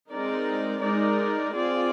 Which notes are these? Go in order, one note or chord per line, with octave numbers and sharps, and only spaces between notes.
G#3 C4 D#4 A#4 D5
G#3 D#4 A#4 D5
C4 F4 G#4 D5